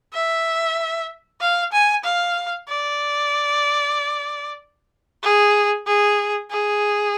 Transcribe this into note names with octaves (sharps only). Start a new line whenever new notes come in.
E5
F5
G#5
F5
D5
G#4
G#4
G#4